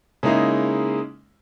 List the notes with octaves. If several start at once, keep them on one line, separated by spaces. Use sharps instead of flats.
C#3 G#3 A#3 D#4 E4